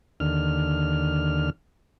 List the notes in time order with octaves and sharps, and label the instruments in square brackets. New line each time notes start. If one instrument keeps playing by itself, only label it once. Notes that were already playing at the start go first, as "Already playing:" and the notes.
[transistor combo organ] D#2 D3 F6